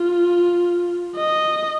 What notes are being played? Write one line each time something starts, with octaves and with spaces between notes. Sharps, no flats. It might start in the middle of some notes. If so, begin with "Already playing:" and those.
Already playing: F4
D#5